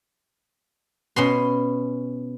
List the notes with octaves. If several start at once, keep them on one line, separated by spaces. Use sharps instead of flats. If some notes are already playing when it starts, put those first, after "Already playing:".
B2 C#4 C6